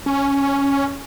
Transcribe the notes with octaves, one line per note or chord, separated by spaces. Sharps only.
C#4